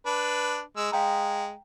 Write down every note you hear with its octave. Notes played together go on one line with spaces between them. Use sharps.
D4 B4
G#3 E6
G#3 F5 G5 A#5